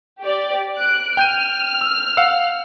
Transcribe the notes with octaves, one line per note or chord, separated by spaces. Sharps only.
G4 D5
F#6 D7
G5 F6 G6 D#7
E6
F5 F#5 E6